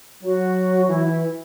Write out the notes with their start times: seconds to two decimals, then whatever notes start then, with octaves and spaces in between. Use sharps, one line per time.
0.23 F#3 F#4
0.88 E3 E4
1.05 E4